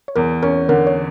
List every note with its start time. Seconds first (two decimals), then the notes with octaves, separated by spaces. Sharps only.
0.08 C#5
0.16 E2 A#4
0.42 C#4 A#4
0.69 D3 A#4
0.87 C#5